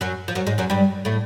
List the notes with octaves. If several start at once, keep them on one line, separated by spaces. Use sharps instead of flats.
F#2 F#3
F3
F#2 F#3
G#2 G#3
F#2 F#3
G2 G3
A2 A3